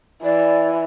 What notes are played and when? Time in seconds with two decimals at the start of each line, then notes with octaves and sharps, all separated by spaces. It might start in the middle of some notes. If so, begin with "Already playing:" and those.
0.24 E3 D5